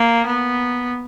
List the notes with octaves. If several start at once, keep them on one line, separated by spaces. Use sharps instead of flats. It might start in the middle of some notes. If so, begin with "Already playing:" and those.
Already playing: A#3
B3